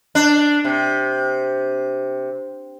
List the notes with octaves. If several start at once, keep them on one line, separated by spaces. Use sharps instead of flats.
D4
C3